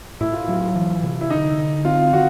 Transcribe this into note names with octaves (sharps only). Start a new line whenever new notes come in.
A2 E4
F4
F#3 E4
E3
C3
E4
D3 D#4
D3
C4 F4
D#3 F#4